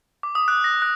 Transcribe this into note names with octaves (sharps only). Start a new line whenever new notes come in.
D6
D#6
F#6
A#6
F#6